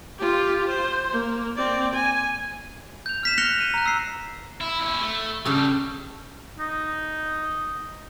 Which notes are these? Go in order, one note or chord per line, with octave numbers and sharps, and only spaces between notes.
F4 G4
C5
A#3
C4 D5
G#5
G6 F7
F6 B6 E7
F6 F#6 A#6 C#7 F7 G7
D#7 E7
A#5 F#6
E6 C7
E4
C#4 E4
A3
C#3 F#3 G3 A4
D#4